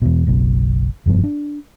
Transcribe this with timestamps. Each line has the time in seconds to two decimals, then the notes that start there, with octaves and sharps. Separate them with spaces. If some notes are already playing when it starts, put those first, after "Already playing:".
0.02 E2 B2
0.27 F#1 B1 B2
1.06 F1 G2 F3 B3
1.24 D4